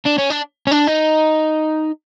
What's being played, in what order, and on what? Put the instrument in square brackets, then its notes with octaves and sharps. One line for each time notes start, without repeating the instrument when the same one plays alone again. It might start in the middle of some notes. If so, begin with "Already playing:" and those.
[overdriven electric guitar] D4
C#4
D4
C#4
D4
D#4